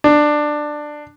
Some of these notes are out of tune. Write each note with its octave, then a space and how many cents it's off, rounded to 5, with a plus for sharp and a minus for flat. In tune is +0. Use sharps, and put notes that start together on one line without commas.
D4 +15